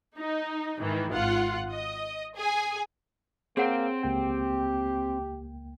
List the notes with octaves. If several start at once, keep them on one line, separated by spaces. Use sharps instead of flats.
D#4
G#2 D#3 E3
G#1 F4 F#5
D#5
G#4 G#5
A#3 C4 G#4 C5 C#5 F#5
C#2 A#3 G4 G5